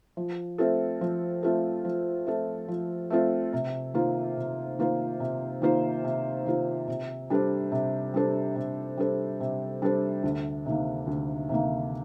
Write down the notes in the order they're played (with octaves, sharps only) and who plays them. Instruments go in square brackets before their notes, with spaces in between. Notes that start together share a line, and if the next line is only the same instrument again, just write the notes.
[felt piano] F3
A3 C4 F4 A4
F3
A3 C4 F4 A4
F3
A3 C4 F4 A4
F3
A3 C4 F4 A4
C3
D#3 A#3 F4 C5
C3
D#3 A#3 F4 C5
C3
D#3 A#3 F4 C5
C3
D#3 A#3 F4 C5
C3
G3 D4 A4 C5
C3
G3 D4 A4 C5
C3
G3 D4 A4 C5
C3
G3 D4 A4 C5
D2
C3 D#3 A#3
D2
C3 D#3 A#3